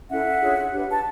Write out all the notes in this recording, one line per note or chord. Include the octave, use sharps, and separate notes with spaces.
C#4 E4 A4 E5 F#5
D4 F4 G#4 C#5
D4 G4 B4
A5